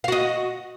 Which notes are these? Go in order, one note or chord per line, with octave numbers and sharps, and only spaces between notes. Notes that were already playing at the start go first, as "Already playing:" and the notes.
F#4 D#5 F5